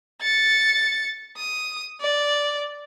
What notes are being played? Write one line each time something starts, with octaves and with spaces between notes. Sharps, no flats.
A6 C#7
D#6
D5